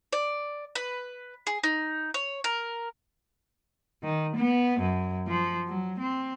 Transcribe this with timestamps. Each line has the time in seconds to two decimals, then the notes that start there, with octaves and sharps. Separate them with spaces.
0.13 D5
0.75 B4
1.47 G#4
1.63 D#4
2.14 C#5
2.44 A#4
4.03 D#3
4.36 B3
4.80 F#2
5.28 F3
5.67 F#3
6.00 C4